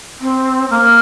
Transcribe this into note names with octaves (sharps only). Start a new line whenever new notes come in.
C4
A#3